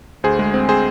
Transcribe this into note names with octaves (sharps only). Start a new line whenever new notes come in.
D2 G#4 C5
G#3
C4
C4 G#4 C5